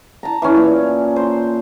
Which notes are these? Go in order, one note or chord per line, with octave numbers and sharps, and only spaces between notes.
A5 A#5
E3 C#4
A#2
C5